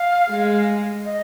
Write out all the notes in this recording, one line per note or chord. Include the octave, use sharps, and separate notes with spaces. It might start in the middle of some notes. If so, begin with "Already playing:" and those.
Already playing: F5
G#3
D#5